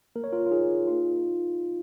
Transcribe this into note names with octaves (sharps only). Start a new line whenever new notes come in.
A#3 A#4
C#5
F4 A#4
F4
D#4 G#4
D#4 F4